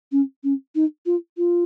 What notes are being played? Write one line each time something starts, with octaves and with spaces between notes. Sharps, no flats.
C#4
C#4
D#4
F4
F4